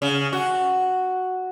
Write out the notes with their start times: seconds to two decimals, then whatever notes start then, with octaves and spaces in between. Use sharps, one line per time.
0.02 C#3
0.33 F#4